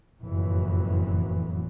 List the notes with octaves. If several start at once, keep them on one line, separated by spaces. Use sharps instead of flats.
F#1 F2 A2 E3 F#3